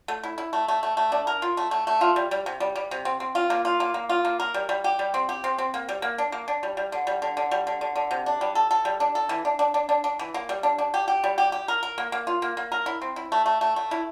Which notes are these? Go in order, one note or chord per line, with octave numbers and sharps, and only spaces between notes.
A3
E4
E4
A3
A3
A3
A3
D4
A#4
F4
A3
A3
A3
F4
G3
G3
C3
G3
G3
C3
C4
C4
F4
A#3
F4
A#3
A#3
F4
A#3
A#4
G3
G3
G4
G3
C4
G4
C4
C4
A#3
G3
A#3
D4
A#3
D4
G3
G3
D3
G3
D3
D3
G3
D3
D3
D3
C3
D4
G3
A4
A4
G3
D4
A4
E3
D4
D4
D4
D4
D4
E3
A#3
G3
D4
D4
G4
G4
G3
G4
G4
A#4
A#4
A#3
A#3
F4
A#3
A#3
A#4
E4
C4
E4
A3
A3
A3
A3
E4